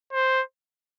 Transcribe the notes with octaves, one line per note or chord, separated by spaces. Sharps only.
C5